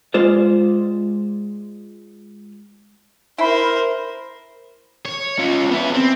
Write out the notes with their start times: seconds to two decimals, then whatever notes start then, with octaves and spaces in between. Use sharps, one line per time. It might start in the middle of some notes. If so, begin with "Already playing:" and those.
0.14 G#3 F4 C5 D5
3.38 E4 A#4 C5 B5
5.05 C#5
5.39 C#4 F4
5.71 B3 E4
5.94 C4